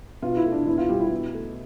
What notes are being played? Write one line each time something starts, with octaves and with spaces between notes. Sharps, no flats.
B2 F4
E4
A3
D4
E2 E4
F4
B2 G3 G4
E4
B2
A3